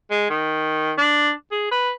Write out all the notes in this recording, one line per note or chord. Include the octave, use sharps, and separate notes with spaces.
G#3
D#3
D4
G#4
B4